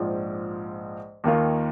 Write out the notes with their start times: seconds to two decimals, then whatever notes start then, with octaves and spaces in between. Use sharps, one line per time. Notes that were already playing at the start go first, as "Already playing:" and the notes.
Already playing: A#1 G#2 F3
1.24 D#2 D#3 A#3 F4